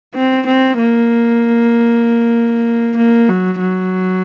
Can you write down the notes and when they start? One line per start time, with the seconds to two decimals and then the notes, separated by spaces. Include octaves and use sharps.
0.15 C4
0.46 C4
0.78 A#3
2.96 A#3
3.29 F#3
3.59 F#3